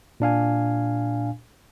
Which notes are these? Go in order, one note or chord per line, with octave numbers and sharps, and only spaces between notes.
A#2 D4 F5 G#5